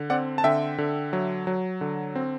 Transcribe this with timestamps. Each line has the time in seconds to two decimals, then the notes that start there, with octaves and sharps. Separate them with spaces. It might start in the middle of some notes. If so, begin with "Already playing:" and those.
Already playing: D3
0.10 C4 D5 F#5
0.38 A5
0.44 D3 E5 G5
0.78 D3
1.13 F#3
1.47 F#3
1.81 D3
2.15 C4